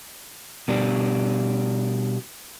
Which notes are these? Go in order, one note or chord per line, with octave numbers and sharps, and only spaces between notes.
B2 G3 D4